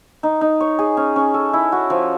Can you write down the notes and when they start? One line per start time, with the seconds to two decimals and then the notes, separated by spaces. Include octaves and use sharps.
0.23 D#4
0.41 D#4
0.60 C#5
0.79 G#4
0.97 C#4
1.16 C#4
1.34 A4
1.53 E4
1.72 F#4
1.90 F3